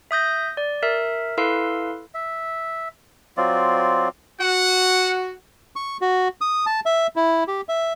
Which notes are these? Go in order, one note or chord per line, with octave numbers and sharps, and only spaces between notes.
E5 D#6 G6 A#6
D5
A#4 E5
E4 A4 B4 F5 C6
E5
F#3 C4 F4 D5
F#4 F#5
C#6
F#4
D#6
A5
E5
E4
G4
E5